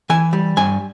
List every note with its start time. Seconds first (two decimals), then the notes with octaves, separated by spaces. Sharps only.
0.10 E3 G#5
0.33 G3
0.57 G2 G#5